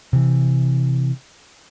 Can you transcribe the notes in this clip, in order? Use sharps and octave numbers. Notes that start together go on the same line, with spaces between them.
C3 E3